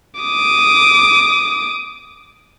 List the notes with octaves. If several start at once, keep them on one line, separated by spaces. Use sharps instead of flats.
D6 D#6